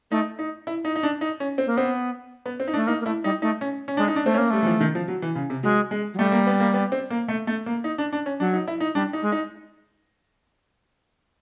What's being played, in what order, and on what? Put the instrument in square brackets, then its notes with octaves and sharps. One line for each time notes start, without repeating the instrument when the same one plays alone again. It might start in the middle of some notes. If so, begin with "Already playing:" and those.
[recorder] A3 [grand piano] D#4
[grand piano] D#4
E4
D#4
D#4
D4
D#4
C#4
C4
[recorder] A#3
[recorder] B3 [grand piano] C4
[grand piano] B3
C4
D#4
[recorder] A3 [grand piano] D4
[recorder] A#3 [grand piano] D#4
[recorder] A#3
[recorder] A3 [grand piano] E4
[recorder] G3 [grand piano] D#4
[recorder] A3 [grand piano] D#4
[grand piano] C#4
C#4
[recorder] G#3 [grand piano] D4
[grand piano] D#4
D4
[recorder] A3 [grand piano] C4
[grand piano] C#4
[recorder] A#3
[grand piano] G3 [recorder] A3
[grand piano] E3
F3
D#3
F3
F#3
E3
C#3
C3
[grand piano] F#3 [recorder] G#3
[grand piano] G#3
[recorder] F#3
[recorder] G3 [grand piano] A3
[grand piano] A#3
B3
A#3
B3
C4
A#3
A3
A3
A#3
D#4
D4
D4
C#4
[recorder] F#3 [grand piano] D4
[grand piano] D#4
E4
D#4
[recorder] G3 [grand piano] D4
[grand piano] D#4
[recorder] G#3
[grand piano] D#4